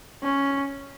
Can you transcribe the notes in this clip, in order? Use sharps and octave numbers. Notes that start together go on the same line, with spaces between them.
C#4